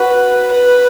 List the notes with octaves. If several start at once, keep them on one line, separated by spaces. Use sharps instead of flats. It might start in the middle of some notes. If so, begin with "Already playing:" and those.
Already playing: F#4 B4
B4